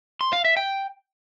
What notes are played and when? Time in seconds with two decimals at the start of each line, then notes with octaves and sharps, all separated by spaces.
0.21 C6
0.33 F5
0.45 E5
0.57 G5